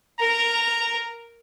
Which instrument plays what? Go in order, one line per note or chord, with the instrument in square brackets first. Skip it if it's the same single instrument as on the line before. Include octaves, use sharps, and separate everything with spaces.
[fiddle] A#4 [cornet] A#5